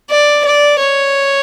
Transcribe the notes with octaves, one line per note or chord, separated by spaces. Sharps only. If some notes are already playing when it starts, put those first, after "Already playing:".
D5
D5
C#5